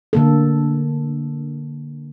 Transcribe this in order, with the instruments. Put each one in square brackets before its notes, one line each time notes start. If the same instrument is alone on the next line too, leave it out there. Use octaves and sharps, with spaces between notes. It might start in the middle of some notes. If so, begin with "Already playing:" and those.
[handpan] D3 A#3 A4